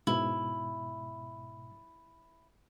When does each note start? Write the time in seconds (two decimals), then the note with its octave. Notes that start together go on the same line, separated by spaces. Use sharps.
0.07 G#2 B2 E4